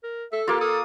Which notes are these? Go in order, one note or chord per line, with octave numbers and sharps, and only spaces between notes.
A#4
A4 E5
A#3 F4 G4
A4 D#6